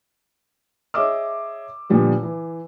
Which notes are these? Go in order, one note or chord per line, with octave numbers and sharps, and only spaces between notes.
G#4 C#5 D#5 E5 D6 E6
A#2 D3 F3 G3 B3
E3